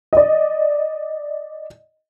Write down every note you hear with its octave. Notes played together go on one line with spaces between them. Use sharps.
D5 D#5